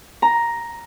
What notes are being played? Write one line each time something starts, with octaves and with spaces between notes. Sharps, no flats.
A#5